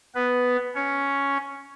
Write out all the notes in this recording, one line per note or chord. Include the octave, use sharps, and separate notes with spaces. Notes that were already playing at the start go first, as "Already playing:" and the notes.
B3 B4
C#4 C#5